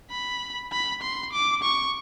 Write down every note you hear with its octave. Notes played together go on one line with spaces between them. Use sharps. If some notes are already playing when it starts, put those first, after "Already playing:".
B5
B5
C6
D6
C#6